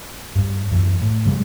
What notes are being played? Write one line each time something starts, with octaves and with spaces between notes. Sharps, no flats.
G2
F#2 E3
A2
G2 C#3 F#3 G#3